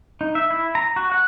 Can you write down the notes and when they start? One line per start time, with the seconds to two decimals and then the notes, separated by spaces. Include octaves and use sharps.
0.21 D#4
0.35 E5
0.51 E4
0.75 A#5
0.96 F#4
1.12 F#5